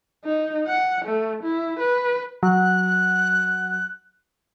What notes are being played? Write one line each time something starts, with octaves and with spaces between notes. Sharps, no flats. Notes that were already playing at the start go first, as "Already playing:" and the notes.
D#4
F#5
A3
E4
B4
F#3 F#6